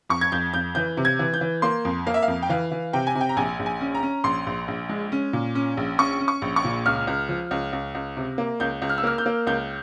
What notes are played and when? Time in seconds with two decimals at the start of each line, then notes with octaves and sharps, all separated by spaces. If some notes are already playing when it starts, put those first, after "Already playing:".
0.10 F2 C#6
0.21 G#6
0.32 F2 G6
0.54 F2 G6
0.75 E3 G6
0.97 C3
1.05 G#6
1.19 E3
1.34 G6
1.41 E3
1.62 A#3 C6
1.85 F2
2.07 A#3 F5
2.14 E5
2.22 F5
2.28 F2
2.43 G5
2.49 E3 F5
2.71 E3
2.93 C3 G5
3.07 G#5
3.15 C3
3.21 G5
3.29 A#5
3.37 A#1 G#5
3.59 A#1
3.66 G#5
3.81 C#4
3.95 A#5
4.03 C#4
4.24 A#1 C6
4.47 A#1
4.68 A#1
4.89 G#3
5.12 C#4
5.33 A#2
5.55 C#4
5.77 A#1
5.98 C#4 C#6
6.20 C#4
6.28 C#6
6.42 A#1
6.56 C#6
6.64 A#2
6.86 C#2 F6
7.07 C#2
7.29 F3
7.51 C#2
7.73 C#2
7.95 C#2
8.17 C3
8.38 A#3
8.60 C#2 G6
8.82 C#2
8.89 F6
8.98 E6
9.03 A#3 F6
9.18 G6
9.26 A#3
9.47 C#2 G6